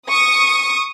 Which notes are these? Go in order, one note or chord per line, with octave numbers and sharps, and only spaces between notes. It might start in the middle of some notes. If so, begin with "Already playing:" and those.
C#6 D#6